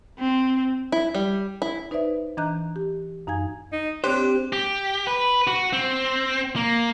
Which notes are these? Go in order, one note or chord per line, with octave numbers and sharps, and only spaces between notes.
C4
E4
G3
E4
D#4 B4 C5 D5 E5
E3 D4 D#5 A#5 F#6 G6
G4
F#2 D#4 F5 G#5 G#6
D#4
C4 D4 G4 C5 C#5
G4
B4
F#4
C4
A#3